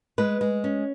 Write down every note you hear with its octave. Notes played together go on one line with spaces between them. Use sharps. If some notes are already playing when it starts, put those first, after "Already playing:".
G#3 B4
G#3
C#4